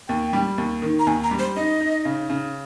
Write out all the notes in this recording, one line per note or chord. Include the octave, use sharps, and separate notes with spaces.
D#2 G5
G3
D#2
D#3
A#5
D#2 G#5
A#5
G3
C5
D#4 D#5
D#4
C#3
C#3